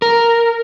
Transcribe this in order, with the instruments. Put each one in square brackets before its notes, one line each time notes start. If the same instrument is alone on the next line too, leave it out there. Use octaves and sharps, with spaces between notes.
[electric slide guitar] A#4